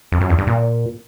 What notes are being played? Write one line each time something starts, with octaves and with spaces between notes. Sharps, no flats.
F2
F#2
E2
G2
A#2